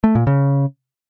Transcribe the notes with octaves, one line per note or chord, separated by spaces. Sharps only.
A3
A#2
C#3